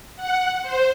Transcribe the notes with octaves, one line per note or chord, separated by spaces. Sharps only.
F#5
C5